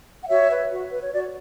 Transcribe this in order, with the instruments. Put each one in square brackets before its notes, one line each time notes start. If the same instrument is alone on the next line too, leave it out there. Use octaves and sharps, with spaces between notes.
[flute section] F#5
F#4 C#5 E5
B4
F#4
B4
C#5
F#4 D5